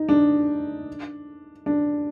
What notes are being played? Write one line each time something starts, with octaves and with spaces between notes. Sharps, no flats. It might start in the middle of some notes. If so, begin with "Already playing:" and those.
Already playing: D#4
D4
D4